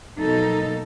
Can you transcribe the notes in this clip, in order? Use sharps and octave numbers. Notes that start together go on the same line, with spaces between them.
B2 F#3 A#3 D#4 A4